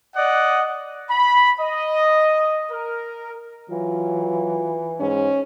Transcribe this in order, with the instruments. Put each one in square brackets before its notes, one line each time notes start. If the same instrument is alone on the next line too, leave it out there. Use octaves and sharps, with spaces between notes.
[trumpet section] D5 D#5 F#5
[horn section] B5
D#5
A#4
[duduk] E3 [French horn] F#3 [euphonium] F4
[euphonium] G#2 [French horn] C#4